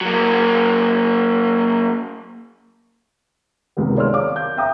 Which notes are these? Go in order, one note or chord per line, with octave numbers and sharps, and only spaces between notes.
F#3 A#3
C#2 C3 D#3 B3
C#5 D5 C6 E6 F6
F5 D6
G6
E5 F5 G5 A#5 D6 D#6